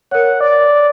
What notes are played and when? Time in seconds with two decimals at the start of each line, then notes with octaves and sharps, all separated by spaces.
0.11 A#4 C#5 F#5
0.41 D5